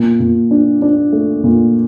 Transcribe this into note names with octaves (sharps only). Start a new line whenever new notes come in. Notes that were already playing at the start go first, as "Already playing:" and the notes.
Already playing: A#2
A#2
D4
D4
A3
A#2